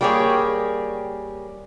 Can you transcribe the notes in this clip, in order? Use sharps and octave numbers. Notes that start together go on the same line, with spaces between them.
G3 A#3 G4 G#4 C#5